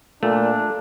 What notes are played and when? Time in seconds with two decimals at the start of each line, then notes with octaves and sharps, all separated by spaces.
0.23 A#2 A3 D4